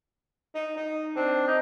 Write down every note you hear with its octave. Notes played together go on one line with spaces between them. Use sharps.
D#4
D#4
C4 D4
D#4